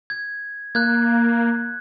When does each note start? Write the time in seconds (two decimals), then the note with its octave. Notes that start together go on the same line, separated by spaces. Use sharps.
0.10 G#6
0.75 A#3 F#6 G#6